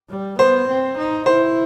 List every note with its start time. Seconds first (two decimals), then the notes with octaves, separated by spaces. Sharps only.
0.09 G3
0.39 B3 C5
0.68 C4
0.97 D#4
1.26 E4 C5